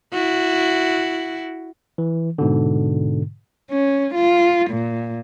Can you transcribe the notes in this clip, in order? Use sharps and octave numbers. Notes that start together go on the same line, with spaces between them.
E4 F#4
E3
G#2 B2 D3
C#4
F4
A#2